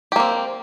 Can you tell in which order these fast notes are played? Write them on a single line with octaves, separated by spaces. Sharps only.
G4 A#3 C4